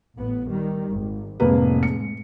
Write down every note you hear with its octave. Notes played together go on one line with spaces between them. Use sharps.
A1 A2 B3
D#3 G3
G#1
F1 A2 G#3 A#3 B4
C#7